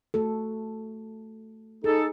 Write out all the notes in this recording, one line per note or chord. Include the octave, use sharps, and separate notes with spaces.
A3 F#4 A4
D#4 G#4 A4